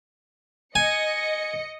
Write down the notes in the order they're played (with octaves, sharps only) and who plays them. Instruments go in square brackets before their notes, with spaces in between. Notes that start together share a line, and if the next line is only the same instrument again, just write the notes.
[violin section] D#5 C#7 [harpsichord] G#5